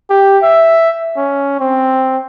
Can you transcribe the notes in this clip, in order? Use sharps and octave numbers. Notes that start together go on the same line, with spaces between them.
G4
E5
C#4
C4